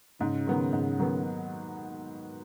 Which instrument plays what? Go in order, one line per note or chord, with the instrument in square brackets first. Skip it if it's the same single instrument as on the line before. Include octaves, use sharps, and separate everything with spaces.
[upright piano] G#2 [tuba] C#3
[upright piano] D#3 F#3 B3
G#2
D#3 F#3 B3